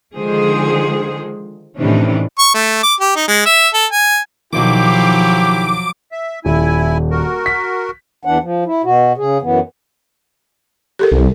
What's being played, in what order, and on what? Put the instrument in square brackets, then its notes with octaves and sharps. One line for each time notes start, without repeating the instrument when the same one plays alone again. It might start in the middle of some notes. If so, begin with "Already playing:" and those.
[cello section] D3 D#3 F3 G#3 G#4 C5
A2 C3 D#3 E3 C#4 D4
[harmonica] C#6
A3
D6
G4
D#4
G#3
E5
A4
G#5
[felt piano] B1 D#3 [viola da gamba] F3 F#3 [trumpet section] E4 G4 [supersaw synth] D6
[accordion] E5
[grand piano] D#1 [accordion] E4 G#5
[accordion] F#4 A#4
[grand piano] B6
[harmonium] E2 E3 D4 F#5
F3
E4
B2 F#4
C#3 G#4
F#2 E3 B3
[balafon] G4 A4 A#4
[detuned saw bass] C2